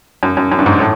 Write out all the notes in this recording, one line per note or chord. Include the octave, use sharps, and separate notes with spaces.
F#2
F#2
F#2
G2
G#2
A2